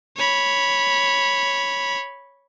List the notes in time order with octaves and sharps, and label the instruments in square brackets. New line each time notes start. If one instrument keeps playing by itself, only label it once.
[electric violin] C#5 B5